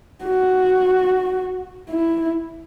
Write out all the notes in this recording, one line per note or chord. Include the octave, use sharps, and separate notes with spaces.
F#4
E4